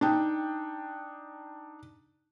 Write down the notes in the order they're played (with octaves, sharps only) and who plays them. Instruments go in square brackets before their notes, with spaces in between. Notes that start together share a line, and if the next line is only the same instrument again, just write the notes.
[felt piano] D4 D#4 G5